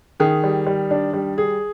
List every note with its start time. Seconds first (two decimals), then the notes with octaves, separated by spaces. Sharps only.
0.20 D#3 G#4
0.44 G3
0.67 G3
0.91 D4
1.13 G3
1.38 G#4